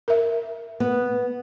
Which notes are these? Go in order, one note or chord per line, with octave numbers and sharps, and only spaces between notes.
A#4 E5
B3